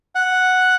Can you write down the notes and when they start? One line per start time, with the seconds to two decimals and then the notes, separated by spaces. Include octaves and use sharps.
0.15 F#5